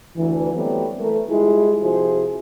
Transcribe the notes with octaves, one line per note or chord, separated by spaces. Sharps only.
D2 E3
F#3 G3 A3 B3 C4 G4
E3 A3 A#4
G3 G#3 E4 F4 G#4
C3 F3 E4 F#4 G#4 C5